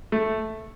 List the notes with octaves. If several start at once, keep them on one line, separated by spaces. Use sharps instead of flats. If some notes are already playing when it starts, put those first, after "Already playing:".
A3